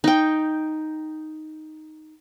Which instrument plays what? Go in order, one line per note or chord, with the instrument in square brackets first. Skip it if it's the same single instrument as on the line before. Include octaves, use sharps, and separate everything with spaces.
[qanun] D#4 G5